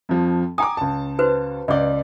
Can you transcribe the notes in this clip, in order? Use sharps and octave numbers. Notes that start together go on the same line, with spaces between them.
F2 F3
G5 G#5 A#5 D6 D#6
C#2 A5
F#4 B4 C5
C#2 D5 D#5 D6